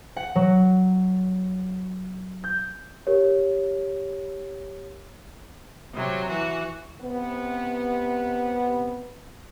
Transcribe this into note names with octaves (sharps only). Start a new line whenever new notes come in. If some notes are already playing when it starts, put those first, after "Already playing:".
F#5
F#3
G6
G4 A#4 C#5
C3 F#3
E3 F#4
C3 B3